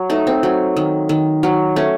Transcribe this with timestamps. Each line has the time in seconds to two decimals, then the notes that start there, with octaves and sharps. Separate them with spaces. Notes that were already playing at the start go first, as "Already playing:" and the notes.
Already playing: F#3
0.10 A3 D#4
0.27 C4
0.43 F#3
0.76 D#3
1.09 D#3
1.43 F#3
1.76 A3 C#4